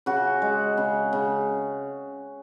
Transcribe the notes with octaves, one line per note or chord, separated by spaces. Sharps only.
C#3 F#4
G#3
C#3
C#3